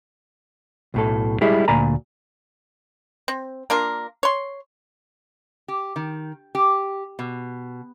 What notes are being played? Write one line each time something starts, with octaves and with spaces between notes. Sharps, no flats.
B1 A2 A4
G3 G#3 E4 G4 G#4
D2 A#2 D5 G#5 A#5 B5
C4
A#3 D4 F4 A#4
C#5 C6
G4
D#3
G4
B2